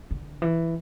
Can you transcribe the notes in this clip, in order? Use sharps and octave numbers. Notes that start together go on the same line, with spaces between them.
D3
E3